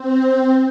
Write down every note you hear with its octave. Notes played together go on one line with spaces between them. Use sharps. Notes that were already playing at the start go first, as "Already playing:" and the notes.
Already playing: C4